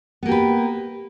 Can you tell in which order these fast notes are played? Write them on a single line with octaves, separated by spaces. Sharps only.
B3 A#3 G4 B4